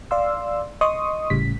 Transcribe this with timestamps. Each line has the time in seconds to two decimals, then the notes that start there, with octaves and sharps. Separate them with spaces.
0.11 D5 F5 C6 E6
0.81 D#5 C6 C#6 D#6
1.30 G#1 A2 C#3 G3 B6